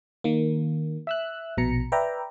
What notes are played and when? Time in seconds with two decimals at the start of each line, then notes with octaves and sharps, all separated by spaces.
0.24 D#3 A#3
1.07 E5 E6 F#6
1.57 A#1 B2 A#5 C#7
1.92 B4 D5 E5 G5 A#5